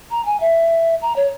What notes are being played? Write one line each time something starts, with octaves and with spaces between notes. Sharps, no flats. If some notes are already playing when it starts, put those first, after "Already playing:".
A#5
G#5
E5
A#5
C#5